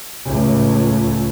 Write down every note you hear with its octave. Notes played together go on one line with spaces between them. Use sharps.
C#2 A2